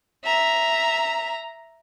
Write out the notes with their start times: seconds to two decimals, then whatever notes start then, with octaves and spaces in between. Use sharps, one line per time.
0.25 E5 A#5